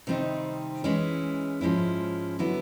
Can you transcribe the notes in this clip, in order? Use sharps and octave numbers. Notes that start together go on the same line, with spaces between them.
C3 D#3 G3 C4 D#4
E3 G#3 C#4 E4
G#2 F3 G#3 C#4 E4
D3 F#3 B3 E4